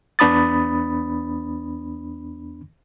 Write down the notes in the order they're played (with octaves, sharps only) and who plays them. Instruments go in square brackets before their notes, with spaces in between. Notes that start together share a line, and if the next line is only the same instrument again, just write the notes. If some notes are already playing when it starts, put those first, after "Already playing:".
[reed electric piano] E2 B3 D4 B5 D#6 A6